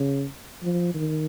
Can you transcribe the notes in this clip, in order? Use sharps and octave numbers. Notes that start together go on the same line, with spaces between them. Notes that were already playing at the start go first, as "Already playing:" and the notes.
Already playing: C#3
F3
D#3